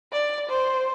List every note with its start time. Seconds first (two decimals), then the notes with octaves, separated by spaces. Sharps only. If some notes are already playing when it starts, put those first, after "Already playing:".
0.12 D5
0.49 C5